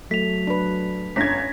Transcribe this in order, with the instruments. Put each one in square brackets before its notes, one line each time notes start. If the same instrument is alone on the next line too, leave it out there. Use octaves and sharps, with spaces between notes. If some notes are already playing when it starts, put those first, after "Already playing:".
[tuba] F#3 [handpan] A3 [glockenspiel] B6 F7
[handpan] D4 B4
[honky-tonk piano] G1 G#6 [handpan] C#4 [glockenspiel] A#6 B6